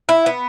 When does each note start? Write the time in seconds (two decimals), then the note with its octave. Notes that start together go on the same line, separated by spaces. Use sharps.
0.09 E4
0.26 B3